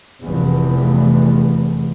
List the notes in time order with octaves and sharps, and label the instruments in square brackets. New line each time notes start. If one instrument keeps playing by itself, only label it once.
[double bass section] F1 E2